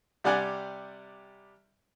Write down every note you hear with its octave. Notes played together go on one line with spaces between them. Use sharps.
C3 G3 D5 F#5 G#5